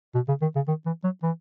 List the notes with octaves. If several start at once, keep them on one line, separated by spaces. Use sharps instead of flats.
B2
C#3
D#3
C#3
D#3
E3
F#3
E3